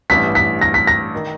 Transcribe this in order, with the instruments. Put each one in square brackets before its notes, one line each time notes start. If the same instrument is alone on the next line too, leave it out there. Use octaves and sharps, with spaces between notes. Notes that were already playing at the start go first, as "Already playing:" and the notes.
[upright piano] A1 G2 E3 [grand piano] B6
[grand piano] B6
A#6
B6
A#6
[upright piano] D#3